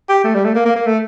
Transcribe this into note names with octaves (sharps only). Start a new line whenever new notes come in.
G4
A3
G3
A3
A#3
A#3
A#3
A3